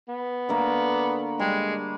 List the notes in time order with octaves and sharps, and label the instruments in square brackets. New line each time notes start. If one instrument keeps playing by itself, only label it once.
[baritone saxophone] B3
[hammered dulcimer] D3 A3 A#3
[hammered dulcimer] G3 [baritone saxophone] G#3